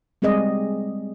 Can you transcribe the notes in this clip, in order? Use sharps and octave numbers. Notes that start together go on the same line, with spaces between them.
G3 G#3 C4 G#4 D5 D#5